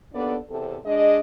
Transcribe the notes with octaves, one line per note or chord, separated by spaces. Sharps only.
D#2 B3 D4 A4 D5
E2 C3 C4 A4
G#3 D4 G#4 D#5